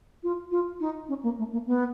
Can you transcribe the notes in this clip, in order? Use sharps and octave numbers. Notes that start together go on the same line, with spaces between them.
F4
F4
D#4
C#4
A#3
A3
A#3
B3